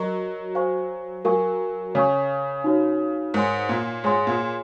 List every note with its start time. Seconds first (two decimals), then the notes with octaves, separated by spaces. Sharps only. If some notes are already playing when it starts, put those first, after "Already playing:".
Already playing: F#3 A#4 D#5 A#5 C#6
0.55 C5 F5 G#5 C#6
1.25 F#3 A#4 F5 G#5 C#6
1.95 C#3 C#5 G#5 C#6
2.64 D#4 F#4 C#5
3.34 G#2 A#4 C#5 G#5 C6
3.69 A#2
4.04 G#2 G#4 C#5 G#5 C6
4.27 A#2